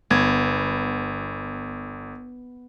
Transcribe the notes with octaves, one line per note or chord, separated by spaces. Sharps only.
G1 B3 G#6